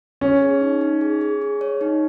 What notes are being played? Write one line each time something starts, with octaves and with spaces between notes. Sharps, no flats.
C#4 C#5
G#4
D#4
D#4
G#4
G#4
G#4
C#5
D#4